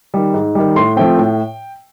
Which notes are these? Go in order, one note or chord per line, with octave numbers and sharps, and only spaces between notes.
D#3 G3
G#2
D#3 G3
A2 C6
F3 A3 C4 G5
A2